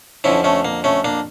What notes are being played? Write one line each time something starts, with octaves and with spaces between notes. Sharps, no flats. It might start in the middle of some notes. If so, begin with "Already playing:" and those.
F2 D3 F3 C#4 E4
A3 C#4
A#3
A3 C#4
A#3 D4